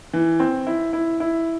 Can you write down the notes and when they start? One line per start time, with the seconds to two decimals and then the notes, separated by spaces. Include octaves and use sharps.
0.13 E3
0.40 C4
0.67 E4
0.93 E4
1.20 E4